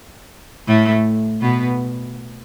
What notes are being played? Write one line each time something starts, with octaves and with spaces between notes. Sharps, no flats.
A2 A3
B2 B3